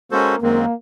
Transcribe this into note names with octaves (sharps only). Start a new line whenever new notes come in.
G#3 A#3 C#4 F#4 A4 C5
F#2 D#3 G#3 A#3 C4